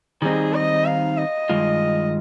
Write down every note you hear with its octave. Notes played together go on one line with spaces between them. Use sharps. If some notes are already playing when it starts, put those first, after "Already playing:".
D#3 G3 C4 D#4 G#4
D#5
F5
D#5
G2 D#3 G#3 F4